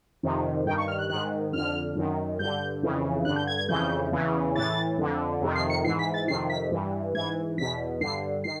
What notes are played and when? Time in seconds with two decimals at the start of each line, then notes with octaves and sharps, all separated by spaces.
0.23 F2 C3 D#3
0.66 G2 D#3 G5
0.78 C#6
0.88 F6
0.99 F#6
1.10 G#2 D#3 F#6
1.53 F2 D3 F6
1.96 F#2 D#3
2.39 G2 D3 G6
2.83 F2 C#3 E3
3.25 G2 D3 F#6
3.36 G6
3.47 G#6
3.57 G#6
3.69 F2 C#3 E3 G6
4.11 E2 C#3 E3
4.55 A2 E3 A6
4.98 F2 D3
5.41 F2 C3 D#3
5.55 C7
5.70 C#7
5.84 G#2 E3 C7
5.99 B6
6.14 A6
6.27 F2 C3 D#3 C7
6.50 B6
6.71 G2 E3
7.14 G#2 E3 G#6
7.58 E2 B2 B6
8.01 G2 D3 C7
8.44 D#3 C7